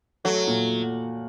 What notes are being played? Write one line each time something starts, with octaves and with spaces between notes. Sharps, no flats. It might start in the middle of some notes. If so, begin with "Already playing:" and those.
F#3 A3
A#2